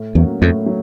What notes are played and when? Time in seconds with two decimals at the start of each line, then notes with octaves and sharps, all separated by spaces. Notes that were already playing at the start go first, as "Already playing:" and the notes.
Already playing: A2
0.15 E2 F#3 A#3 C#4 F#4
0.41 F2 A2
0.66 F#3